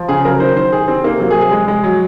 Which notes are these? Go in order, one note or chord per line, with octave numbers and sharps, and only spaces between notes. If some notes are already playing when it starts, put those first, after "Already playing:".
Already playing: F3
C#3 G#4
F#3 A#4
D#3 C5
D#3 C5
C3 G#4
D#3 C4
C3 A#3
F#3 A#3
G#4
C3
G#4
G#3
G#3
F#3